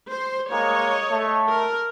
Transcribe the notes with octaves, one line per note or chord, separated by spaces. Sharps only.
C5
G#3 A#3 C#5 D#5
A3
A#4